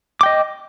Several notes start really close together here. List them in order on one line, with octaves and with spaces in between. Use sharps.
D6 G5 D#5